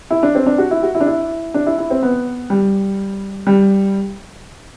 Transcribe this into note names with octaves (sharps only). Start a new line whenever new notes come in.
E4
D4
C4
D4
F#4
E4
F#4
E4
D4
E4
D4
E4
E4
C4
B3
G3
G3